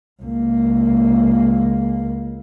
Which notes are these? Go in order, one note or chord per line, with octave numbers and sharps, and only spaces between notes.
C#2 A#3